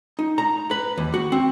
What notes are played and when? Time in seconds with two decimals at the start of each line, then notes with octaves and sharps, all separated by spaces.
0.19 D#4
0.38 A#5
0.71 B4
0.98 D#2
1.14 F#4
1.32 C4